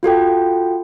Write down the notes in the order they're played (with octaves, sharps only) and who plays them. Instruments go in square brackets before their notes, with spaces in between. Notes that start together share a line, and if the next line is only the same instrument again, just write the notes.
[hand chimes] F4 F#4 A4 G5